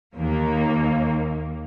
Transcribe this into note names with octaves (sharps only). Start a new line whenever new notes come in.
D#2 A#3